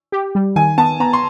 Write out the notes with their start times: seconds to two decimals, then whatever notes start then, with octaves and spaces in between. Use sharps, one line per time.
0.12 G4
0.35 G3
0.56 D#3 G#5
0.78 B3 A5
1.00 B3 A#5
1.13 C6